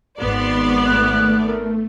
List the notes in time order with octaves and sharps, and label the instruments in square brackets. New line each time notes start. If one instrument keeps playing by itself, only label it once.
[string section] G#1 B3 D5 [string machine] C6
[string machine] A3 [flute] F#6
[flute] A#4